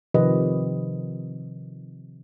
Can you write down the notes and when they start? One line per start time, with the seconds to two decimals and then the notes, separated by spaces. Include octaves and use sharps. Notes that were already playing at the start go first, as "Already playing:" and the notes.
0.14 C3 D#3 F3 G4 B4 D#5